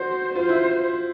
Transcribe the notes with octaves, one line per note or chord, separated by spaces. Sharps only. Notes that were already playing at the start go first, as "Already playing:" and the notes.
Already playing: F#4 C5
F4 C5
E4